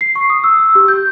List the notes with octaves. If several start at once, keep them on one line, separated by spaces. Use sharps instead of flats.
C7
C#6
D#6
E6
E6
G4
G6